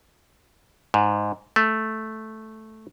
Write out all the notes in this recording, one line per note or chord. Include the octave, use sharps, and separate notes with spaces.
G#2
A3